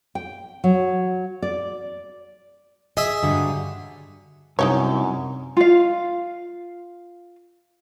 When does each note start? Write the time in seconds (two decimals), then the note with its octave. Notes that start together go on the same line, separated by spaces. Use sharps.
0.15 G5
0.64 F#3
1.42 D5
2.97 G#4 D#5 E5
3.22 G2 D3 F#3
4.59 C2 F#2 D#4 G4 C#5
5.57 F4 F5